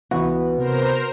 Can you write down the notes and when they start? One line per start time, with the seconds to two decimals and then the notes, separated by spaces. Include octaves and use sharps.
0.11 C#2 E3 B3 F#4 B4
0.58 C3 A#4 C5 A#5